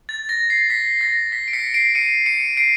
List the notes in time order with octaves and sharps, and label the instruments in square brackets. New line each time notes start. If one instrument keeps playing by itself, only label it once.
[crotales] A6
A#6
C7
B6
A#6
B6
D7
B6 C#7
C7 D7
C#7 D#7
C#7 D#7
C7 D7